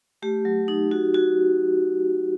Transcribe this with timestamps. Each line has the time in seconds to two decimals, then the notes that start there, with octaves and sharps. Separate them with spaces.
0.22 A3 G4
0.45 F#3
0.68 D#4
0.91 F#4
1.14 F#4